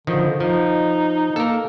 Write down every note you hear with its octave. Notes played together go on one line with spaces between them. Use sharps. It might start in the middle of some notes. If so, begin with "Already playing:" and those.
D3 D#3 F3
F3 D#4
A#3 A4 A#4